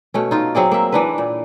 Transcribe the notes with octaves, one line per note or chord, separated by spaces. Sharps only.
B2 A3 C#4
D#4 F4 F5
F#3 C4 G#4 D5
A#3 E5
E3 D4 B4
A#2